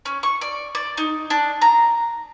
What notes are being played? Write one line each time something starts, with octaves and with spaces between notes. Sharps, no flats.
C#4
C#6
D5
D5
D#4
D4
A#5